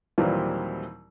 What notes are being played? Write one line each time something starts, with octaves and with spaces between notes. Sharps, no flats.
D#2 A#2 E3 F#3 G3 C4